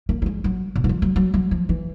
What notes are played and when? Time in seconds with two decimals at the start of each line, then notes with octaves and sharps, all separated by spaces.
0.09 A#3
0.22 G3
0.26 G#3
0.44 F#3
0.76 B2
0.84 E3
0.89 F3
1.02 F#3
1.16 F#3
1.34 F#3
1.51 F3
1.69 E3